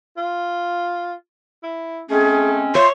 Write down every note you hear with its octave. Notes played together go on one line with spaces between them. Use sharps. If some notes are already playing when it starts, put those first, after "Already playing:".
F4
E4
G#3 A3 C4 C#4 G#4
F4 C#5 E5 C6